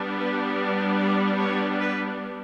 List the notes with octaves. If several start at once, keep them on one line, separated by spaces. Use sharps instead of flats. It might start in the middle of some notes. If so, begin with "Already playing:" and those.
Already playing: G3 B3 D4
B4
D5
C#5
B4